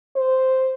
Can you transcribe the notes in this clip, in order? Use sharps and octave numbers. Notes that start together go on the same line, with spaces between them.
C5